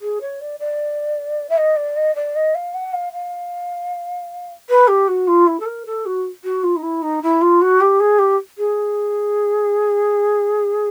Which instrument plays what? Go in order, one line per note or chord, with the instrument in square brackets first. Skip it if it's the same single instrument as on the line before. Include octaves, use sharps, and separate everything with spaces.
[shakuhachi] G#4
C#5
D5
D5
E5
D#5
D5
D#5
D5
D#5
F5
F#5
F5
F5
B4
G4
F#4
F4
E4
A4
A#4
A4
F#4
F#4
F4
D#4
E4
D#4
E4
F4
F#4
G4
G#4
G4
G#4